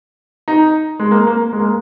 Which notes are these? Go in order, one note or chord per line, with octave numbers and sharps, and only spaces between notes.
D#4
G#3
A#3
A#3
G#3
A#3